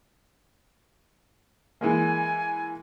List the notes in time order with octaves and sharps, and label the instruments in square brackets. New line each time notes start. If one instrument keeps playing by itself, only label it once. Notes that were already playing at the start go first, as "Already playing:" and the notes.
[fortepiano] E3 G#3 A#3 [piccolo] G#5